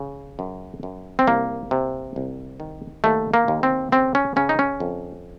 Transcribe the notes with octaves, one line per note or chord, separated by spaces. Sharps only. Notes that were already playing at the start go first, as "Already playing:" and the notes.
Already playing: C#3
F#2
F#2
C4
C2 A#3
C3
C2
D#3
D#2 A3
A#3
D#2
C4
C#3 C4
C#4
C#3 C#4
D#4
C#4
F2